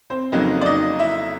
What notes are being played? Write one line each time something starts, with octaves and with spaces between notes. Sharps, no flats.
C4 C5
F2 C#3 F#3 A#3 D#4 D#5
D5
D#4 D#5
E4 E5